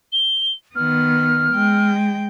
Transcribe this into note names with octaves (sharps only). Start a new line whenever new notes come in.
G7
D#3 B3 F6
G#3 G5